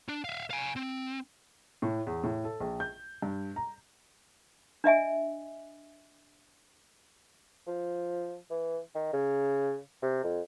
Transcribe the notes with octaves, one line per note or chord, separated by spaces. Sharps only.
D4
E5 F5
F5 G#5
C4
A2
E2
A2
A4
A#1
G6
G2
A#5
D4 D#5 E5 G#5
F3
E3
D#3
C#3
C3
F2